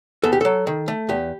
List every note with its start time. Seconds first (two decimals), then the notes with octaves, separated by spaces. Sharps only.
0.24 E2 A4
0.33 G4
0.41 F#3 A4
0.67 D#3
0.88 A3
1.09 E2 G4